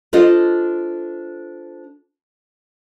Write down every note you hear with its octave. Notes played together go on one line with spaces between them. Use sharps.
D4 F4 A4 C5 D#5